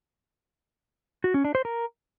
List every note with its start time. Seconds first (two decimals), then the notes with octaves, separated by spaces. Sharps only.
1.24 F#4
1.34 C#4
1.44 D4
1.55 C5
1.65 A#4